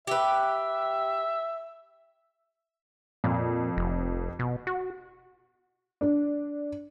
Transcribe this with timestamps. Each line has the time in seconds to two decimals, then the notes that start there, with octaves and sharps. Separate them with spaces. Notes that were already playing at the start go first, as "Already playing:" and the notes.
0.07 G4 B4 E5
3.24 F2 A#2
3.77 F1
4.39 B2
4.67 F#4
6.01 D4